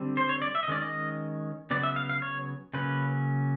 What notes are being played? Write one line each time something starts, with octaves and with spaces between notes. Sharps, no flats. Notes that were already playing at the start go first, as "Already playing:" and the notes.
Already playing: D3 G3 C4
C5
C#5
D5
E5
D#5
D#3 G#3 C#4 D5
D#5
C#3 F#3 B3 D5
E5
F5
F5
C#5
C#3 F#3 A#3 C#4 B4